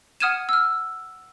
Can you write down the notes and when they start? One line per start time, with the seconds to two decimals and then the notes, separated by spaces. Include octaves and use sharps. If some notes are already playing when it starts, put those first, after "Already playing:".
0.20 F#5 D#6 F6 G#6 D#7 E7
0.49 E6 F6